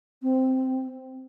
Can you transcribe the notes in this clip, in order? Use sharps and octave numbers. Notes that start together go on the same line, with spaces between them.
C4